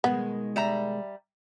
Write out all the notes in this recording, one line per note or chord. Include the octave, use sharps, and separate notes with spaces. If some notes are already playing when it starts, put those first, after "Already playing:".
B2 D#3 G#3 B3
G3 E5 A#5